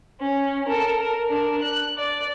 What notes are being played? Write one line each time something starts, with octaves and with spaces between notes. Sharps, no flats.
C#4
A4 A#4
A#4
D4 A#4
F#6
D5